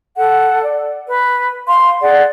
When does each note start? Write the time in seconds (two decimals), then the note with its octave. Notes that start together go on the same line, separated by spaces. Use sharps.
0.17 A4 F#5
0.63 D5
1.07 B4
1.68 F5 C6
2.02 G#4 D5 F#5